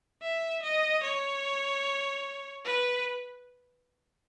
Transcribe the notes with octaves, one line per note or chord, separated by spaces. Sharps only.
E5
D#5
C#5
B4